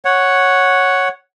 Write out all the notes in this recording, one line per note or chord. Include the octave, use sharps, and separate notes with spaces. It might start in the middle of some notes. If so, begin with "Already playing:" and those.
C#5 F#5